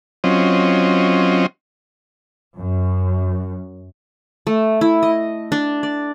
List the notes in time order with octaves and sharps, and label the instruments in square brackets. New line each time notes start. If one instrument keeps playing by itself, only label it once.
[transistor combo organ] F#3 C4 C#4 F4 D#5
[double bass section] F#2
[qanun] A3
E4
D#5
D4
D5